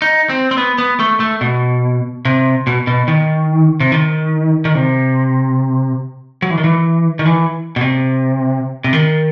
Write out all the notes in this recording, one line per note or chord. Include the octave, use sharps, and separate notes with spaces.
D#4
C4
C4
B3
B3
A3
A3
B2
C3
B2
B2
D#3
C3
D#3
D#3
C3
F#3
E3
D#3
E3
D#3
E3
B2
C3
C3
D#3